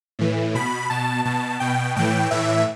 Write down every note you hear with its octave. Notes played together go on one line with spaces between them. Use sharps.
A2 E3
B2 B5
B2 A5
B2 A5
B2 G5
A2 E3 G5
A2 E3 E5